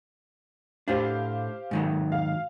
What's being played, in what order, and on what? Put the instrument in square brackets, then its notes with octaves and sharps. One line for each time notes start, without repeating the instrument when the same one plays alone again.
[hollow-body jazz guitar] A2 D4 [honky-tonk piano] G4 C5 F5
[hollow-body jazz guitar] G#2 D#3 F#3
[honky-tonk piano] F5